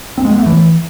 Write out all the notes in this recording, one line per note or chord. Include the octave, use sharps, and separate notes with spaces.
C4
G#3
B3
A3
E3